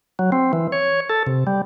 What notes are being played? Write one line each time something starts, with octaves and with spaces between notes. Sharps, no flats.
F#3
C4
E3
C#5
A4
C3
G3